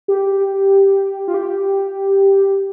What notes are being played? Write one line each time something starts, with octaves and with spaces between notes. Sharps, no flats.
G4
F4
G4